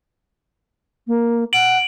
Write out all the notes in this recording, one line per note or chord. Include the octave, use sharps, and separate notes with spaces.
A#3
F#5 D7 F#7